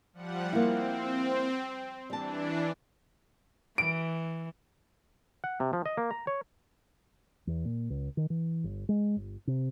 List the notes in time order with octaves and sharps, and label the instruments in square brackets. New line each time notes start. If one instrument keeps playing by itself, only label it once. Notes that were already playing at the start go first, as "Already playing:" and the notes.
[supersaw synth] F3 G3 F#5
[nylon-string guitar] A#3 E4 [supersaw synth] C4
[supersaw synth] E3 D4 [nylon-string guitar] G3 A5
[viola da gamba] E3 [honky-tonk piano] D7
[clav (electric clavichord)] F#5
C3
F3
D#5
A#3
A#5
C#5
[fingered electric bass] E2
A#2
C#2
D#3
E3
G1
G#3
G1
C3